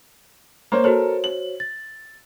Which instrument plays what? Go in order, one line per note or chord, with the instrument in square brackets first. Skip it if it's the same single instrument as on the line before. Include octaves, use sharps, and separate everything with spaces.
[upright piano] A#3 C5 C#5
[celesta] F#4 C5 C#5 [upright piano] A4 A#4
[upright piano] F#7
[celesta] A6